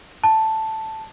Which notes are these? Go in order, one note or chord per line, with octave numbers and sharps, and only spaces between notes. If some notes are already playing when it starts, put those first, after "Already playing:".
A5